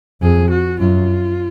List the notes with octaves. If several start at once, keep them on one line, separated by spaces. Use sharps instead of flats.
F2 G#4
F#4
F#2 F4